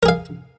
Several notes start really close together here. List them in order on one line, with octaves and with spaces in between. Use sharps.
A#4 G#4 F5